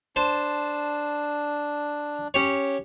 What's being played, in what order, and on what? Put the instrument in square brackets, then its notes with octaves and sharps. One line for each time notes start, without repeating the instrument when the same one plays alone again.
[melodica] D4 [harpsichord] C5 A5 C6
[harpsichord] C#4 G4 C#5